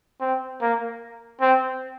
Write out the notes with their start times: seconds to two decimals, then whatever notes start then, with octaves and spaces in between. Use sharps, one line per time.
0.21 C4
0.61 A#3
1.41 C4